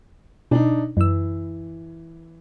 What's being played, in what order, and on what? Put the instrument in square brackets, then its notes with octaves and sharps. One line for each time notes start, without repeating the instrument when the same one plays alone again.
[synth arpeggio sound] B2 [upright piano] D4 D#4
[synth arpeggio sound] F#2 E6 [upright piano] E3